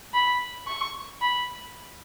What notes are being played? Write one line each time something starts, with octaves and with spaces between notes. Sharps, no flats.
B5
C#6
B5